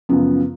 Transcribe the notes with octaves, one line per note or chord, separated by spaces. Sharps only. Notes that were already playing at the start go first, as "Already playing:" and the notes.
F#2 C#3 F3 B3